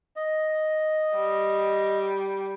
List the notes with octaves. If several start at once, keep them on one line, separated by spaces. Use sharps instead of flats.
D#5
G3